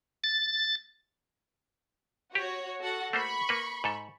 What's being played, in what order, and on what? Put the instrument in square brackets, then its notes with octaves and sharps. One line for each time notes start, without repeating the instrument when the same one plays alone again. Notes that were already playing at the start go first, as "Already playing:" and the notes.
[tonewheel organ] A6
[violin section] F#4 C#5 [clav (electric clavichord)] G4
[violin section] F#4 A4 F#5
[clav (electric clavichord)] A3 A#3 C5 [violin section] B5 C#6
[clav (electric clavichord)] A#3 B4
G#2 A4